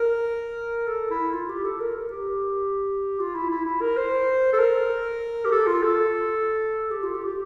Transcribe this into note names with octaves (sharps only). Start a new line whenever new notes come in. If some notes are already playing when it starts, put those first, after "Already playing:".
Already playing: A#4
A4
E4
F4
G4
A4
A#4
A#4
G4
F4
E4
E4
E4
A#4
C5
A4
A#4
G4
A4
F4
A4
G4
F4
G4
G4